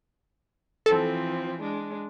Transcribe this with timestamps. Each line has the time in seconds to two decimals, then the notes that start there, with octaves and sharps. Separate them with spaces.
0.86 E3 F3 C4 A4
1.61 G#3 D4